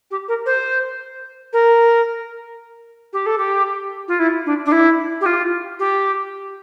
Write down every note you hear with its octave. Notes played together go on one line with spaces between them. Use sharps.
G4
A#4
C5
A#4
G4
A4
G4
F4
E4
D4
D4
E4
G4
F4
G4